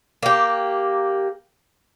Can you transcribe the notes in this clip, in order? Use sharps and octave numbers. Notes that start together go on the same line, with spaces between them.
A#3 G4